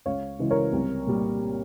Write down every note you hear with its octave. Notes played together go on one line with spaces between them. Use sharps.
C#2 C#5 F5
C#3 E3 G#3
A#4 C#5
C2
A#2 G3